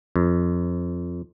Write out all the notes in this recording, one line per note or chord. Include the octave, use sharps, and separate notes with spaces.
F2